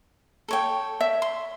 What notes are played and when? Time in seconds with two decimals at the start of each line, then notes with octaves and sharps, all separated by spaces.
0.48 A4 C#5 G5
1.00 E5
1.22 C6